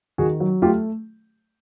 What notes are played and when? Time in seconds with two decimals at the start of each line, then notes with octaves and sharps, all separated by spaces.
0.18 D#3 F#4 G#4
0.40 F#3
0.62 A3 F4 G4